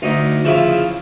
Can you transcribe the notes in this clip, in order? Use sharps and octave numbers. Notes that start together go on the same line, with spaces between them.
D2 D#4
C#3 F3 E4